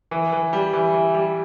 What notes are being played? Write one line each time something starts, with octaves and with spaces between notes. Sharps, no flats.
E3
E3
G3
E3
E3
G3